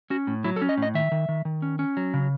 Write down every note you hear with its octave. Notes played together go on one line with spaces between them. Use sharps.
C#4 F#4
A2
F#3 E4
A4
C#4
D#5
A2
D#5
D#3 E5
D#3
D#3
D#3
C#4
C#4
F#3
C#3